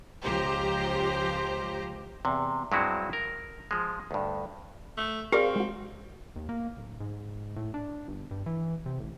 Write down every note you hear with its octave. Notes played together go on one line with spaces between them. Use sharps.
C#2 F3 G4 C5 A#5
E2 C3
G2 F#3 G#3 C4 E4 F#4
A#4
F3 G#3
D2 G2
A3
C4 G4 G#4 A#4 D5 F5
G#3 F#4
D#2
A#3
D1
G#2
A2
D4
G1
G2
E3
C3
A1